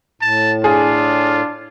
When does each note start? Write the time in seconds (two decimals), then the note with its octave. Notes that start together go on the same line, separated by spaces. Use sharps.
0.22 A2 A5
0.64 D4 F4 G#4